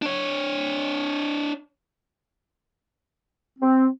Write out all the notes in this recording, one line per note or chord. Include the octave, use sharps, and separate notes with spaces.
D4 C#5
C4